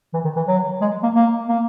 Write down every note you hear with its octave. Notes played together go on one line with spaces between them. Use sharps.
E3
D#3
E3
F#3
G#3
A#3
A#3
A#3